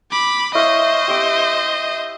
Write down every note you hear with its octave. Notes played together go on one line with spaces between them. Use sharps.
B5 D6
E4 C5 C#5 D#5 F5
G4 E5 D6